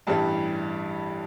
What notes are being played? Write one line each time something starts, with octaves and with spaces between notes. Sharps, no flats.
A1 G2 E3 G3 A5